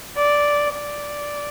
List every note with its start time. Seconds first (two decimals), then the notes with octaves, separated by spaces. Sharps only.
0.17 D5
0.74 D5